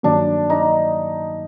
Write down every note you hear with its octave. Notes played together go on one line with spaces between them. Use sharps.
G2 D#3 F#3 A#3 D4
D#4